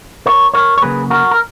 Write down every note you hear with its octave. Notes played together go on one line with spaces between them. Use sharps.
A#4 C#5
A#4 C#5
C#5
C#3 F#3 A#3 G#4 B4
F#4 A#4
A#4